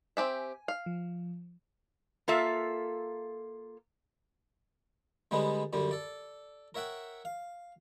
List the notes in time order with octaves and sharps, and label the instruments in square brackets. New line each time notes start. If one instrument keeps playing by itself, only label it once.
[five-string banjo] C4 G4 E5 [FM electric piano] G#5
[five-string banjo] F5
[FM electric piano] F3
[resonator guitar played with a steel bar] A#3 F4 A4 E5
[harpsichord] D3 G3 G#3 B3 D#4
F#2 D3 G3
A4 D5
A#4 C#5 E5 F#5 G5
F5